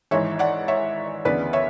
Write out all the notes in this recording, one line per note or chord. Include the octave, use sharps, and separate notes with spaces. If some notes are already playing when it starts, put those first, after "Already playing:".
G#1 G#2 E3 C#5 E5
D5 F#5
C#5 E5
D2 C#3 E3 B3 B4 D5
C#5 E5